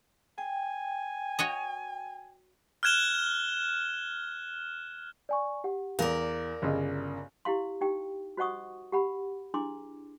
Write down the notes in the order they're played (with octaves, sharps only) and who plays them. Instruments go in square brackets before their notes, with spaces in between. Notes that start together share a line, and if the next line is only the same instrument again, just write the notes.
[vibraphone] G5 [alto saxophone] G#5
[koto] F#4 C#5 D#5
[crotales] F6 F#6 G#6 E7 G7
[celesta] D5 G#5 C#6
G4 F#5
[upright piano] E2 [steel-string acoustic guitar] A#4 D5 [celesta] F5
[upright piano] G1 C#3 D#5
[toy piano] E4 G4 F5 C6
D#4 G4 G5
F#4 C5 D#5 F#5 C#6 D#6
G4 F#5 B5
D4 E4 G#4 C6 D6